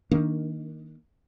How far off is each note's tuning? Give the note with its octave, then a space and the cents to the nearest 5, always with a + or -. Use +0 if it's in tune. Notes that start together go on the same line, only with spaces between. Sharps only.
D#3 +10 A#3 +0 D4 +0